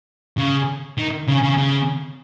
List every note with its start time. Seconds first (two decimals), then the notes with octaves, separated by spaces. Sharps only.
0.38 C#3
0.98 D#3
1.28 C#3
1.43 C#3
1.57 C#3